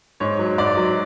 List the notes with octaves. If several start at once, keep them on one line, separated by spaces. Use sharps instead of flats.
G#2 C#5
F#3
G#2 D5
F#3